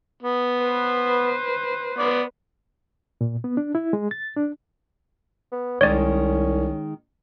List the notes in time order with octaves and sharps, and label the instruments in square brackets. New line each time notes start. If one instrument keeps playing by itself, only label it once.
[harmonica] B3
[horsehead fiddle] B4 C5
[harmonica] B3 D5
[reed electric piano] A#2
B3
D4
E4
G#3
A6
D4
[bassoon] B3
[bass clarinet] C2 [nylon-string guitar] D#3 G#3 [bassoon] C#4 [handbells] C#5 D5